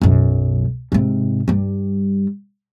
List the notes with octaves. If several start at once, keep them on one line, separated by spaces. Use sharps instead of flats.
B1 F#2
G#2 C3
G2 G3